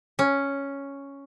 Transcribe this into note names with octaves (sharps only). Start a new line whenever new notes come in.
C#4